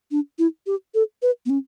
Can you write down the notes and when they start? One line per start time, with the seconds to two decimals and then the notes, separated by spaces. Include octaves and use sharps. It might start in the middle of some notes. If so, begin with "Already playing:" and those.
0.11 D4
0.39 E4
0.67 G4
0.94 A4
1.22 B4
1.46 B3
1.50 C#4